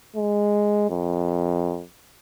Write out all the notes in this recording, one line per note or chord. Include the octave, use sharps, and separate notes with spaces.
G#3
F2